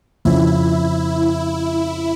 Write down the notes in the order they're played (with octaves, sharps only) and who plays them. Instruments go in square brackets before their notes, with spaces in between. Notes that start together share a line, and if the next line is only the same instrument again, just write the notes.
[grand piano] F2 C#3 F3 [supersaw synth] E4